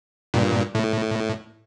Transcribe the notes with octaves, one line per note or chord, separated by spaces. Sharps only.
G2 A#2
A2